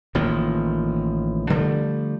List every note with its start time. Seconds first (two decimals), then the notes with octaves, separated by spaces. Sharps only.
0.15 A1 D#3 F3 A#3
1.50 D3 F3 G3 A3